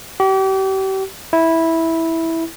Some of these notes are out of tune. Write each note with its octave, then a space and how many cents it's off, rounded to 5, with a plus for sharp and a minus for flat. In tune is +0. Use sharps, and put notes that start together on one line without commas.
G4 -35
E4 -10